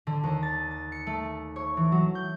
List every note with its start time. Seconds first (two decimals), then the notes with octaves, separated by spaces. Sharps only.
0.07 D3
0.23 D#2
0.43 A6
0.71 A6
0.92 C#7
1.07 A3
1.56 C#5
1.77 E3
1.92 F#3
2.15 G6